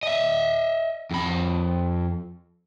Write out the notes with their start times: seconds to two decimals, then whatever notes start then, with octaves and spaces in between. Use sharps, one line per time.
0.03 D#5 E5
1.11 F2 B5